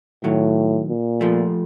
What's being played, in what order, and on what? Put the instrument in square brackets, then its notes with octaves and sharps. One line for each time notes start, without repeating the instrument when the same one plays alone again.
[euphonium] A2 [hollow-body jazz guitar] D#3 F#3
[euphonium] A#2
[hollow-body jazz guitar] F3 A3